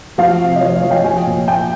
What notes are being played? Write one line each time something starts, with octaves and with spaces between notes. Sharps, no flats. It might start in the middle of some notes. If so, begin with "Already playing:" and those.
F3 F5
C3
D#5
F3 C#5
C#5
F3
G5
F3 G#5
A#2
A#2 G5